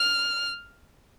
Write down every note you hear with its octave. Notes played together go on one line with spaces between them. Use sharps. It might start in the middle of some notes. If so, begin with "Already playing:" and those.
Already playing: F6